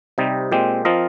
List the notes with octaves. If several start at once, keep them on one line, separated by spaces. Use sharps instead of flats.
C3 G3 C4 D#4
A#2 G#3 C4 G4
F3 C4 F4 A#4 D#5